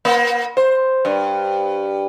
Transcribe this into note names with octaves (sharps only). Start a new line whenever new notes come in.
A#3
C5
G2